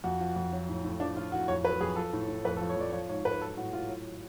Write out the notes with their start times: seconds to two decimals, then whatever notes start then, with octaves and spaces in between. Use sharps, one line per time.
0.04 F2 F#4
0.20 F3
0.36 F2
0.53 F#3
0.69 A2
0.84 A2
1.00 F3 D4
1.16 A2 F4
1.32 A2 F#4
1.48 F2 C#5
1.64 F#3 B4
1.81 F2 G#4
1.96 F3 A4
2.13 A2
2.28 A2
2.45 F2 B4
2.57 A4
2.61 F3
2.69 C#5
2.76 F2 D5
2.92 F3 C#5
3.09 G#2 C#5
3.25 G#2 B4
3.41 F#3 A4
3.57 A2 F#4
3.73 A2 F4
3.89 F#3